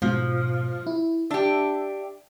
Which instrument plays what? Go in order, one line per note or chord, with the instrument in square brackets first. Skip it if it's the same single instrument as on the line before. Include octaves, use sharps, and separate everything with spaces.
[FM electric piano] G#2 B2 [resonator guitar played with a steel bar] F3
[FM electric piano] E4
[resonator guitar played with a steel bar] D4 G4 [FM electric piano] E5